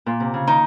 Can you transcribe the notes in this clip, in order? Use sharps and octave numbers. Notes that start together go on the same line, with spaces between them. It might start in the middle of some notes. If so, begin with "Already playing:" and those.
A#2
C3
C#3
D#3 D#4